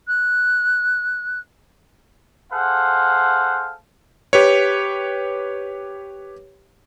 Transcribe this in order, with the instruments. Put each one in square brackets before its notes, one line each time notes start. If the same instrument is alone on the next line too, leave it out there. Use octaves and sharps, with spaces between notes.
[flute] F#6
[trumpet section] G#4 A4 C5 F5 F#5
[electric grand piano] G4 B4 C#5